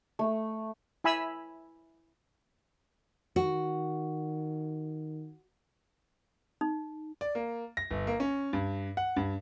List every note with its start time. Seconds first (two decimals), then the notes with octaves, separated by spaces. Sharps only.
0.19 A3
1.04 E4 G#5 B5 E6
3.36 D#3 F#4
6.61 D#4
7.21 D5
7.35 A#3
7.77 A#6
7.91 G1
8.07 A#3
8.20 C#4
8.53 G2
8.97 F#5
9.16 G2